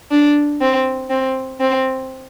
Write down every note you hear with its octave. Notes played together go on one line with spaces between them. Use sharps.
D4
C4
C4
C4